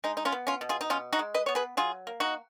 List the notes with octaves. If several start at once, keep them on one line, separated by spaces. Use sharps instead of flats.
G#3 D#4
D#4
C#4 F4
B3
C#4 F4
B2
F4 G#4
D#4
B2 C#4 F4
D#4 F#4
G#3
B4 D#5
B3 C#5
G#4 B4
F#3 F4 G#4
A#3
D#4 F#4